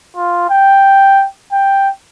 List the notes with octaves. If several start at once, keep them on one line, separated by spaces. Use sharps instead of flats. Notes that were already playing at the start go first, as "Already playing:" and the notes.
F4
G5
G5